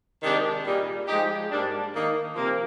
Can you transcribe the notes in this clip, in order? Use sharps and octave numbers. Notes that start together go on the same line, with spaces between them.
C3 D#3 G#3 D4 G4
A#2 G3 A#3 D#4 G#4
F3 G#3 D#4 G4
G#2 G3 A#3 D4
D#3 A#3 D#4
C3 F3 A#3